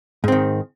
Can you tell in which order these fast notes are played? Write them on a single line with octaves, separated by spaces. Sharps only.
G#2 C4 D#3